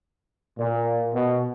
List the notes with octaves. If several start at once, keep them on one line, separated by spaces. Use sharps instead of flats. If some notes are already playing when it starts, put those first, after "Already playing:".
A#2
B2